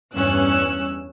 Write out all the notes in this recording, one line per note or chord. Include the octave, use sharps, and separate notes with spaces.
E2 G2 C#4 E6 F#6